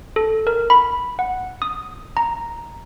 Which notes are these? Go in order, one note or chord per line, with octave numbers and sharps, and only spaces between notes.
A4
A#4
B5
F#5
D#6
A#5